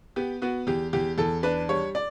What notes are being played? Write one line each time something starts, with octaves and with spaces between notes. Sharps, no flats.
B3 G4
B3 F#4
E2 G4
E2 G4
E2 A4
D4 B4
G3 C#5
D5